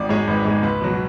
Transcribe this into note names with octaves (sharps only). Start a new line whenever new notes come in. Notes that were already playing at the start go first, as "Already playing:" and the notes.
Already playing: G#1 D5
G#2 G#3 C#5
G#1 B4
G#2 G#3
C#2 B4
B2 F#3